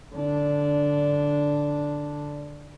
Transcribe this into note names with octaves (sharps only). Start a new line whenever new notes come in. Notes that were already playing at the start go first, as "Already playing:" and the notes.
D3 D4